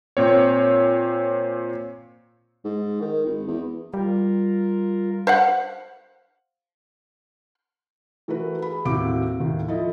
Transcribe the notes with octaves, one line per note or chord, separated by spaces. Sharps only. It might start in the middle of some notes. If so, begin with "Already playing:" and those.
A#2 C4 C#5
G#2
D#3
G#1
E2
G3 F4 A#4
C5 F5 F#5
E3 A3 F#4 A#4 B4
G#4 B5
D#2 A2 C4 F#4 D6 D7
D#2 A2 D#3
F3 E4 A4 D#5